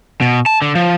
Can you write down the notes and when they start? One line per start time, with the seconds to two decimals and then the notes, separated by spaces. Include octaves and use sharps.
0.21 B2
0.46 A5
0.62 D3
0.75 F3